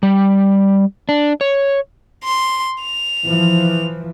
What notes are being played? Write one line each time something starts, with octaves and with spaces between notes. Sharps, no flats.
G3
D4
C#5
C6
F7
E3 F3